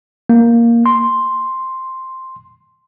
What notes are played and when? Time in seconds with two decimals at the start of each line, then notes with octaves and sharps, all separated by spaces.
0.29 A#3
0.86 C6